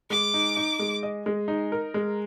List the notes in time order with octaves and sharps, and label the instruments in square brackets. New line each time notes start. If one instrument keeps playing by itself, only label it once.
[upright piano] G#3 [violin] D6
[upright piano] D#4
D#4
G#3
D#5
G#3
D#4
A#4
G#3